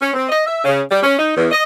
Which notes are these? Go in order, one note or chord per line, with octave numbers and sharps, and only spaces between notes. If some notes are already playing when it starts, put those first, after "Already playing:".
C#4
C4
D#5
E5
C#3
G3
C#4
D#4
E2
D#5